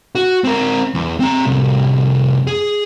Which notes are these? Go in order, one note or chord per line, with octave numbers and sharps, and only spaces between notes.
F#4
C4 A#4
E2
C4 A#5
C2 F2
G#4